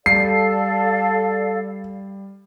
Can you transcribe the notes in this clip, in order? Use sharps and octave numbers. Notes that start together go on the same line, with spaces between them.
G3 A4 D5 F5 C7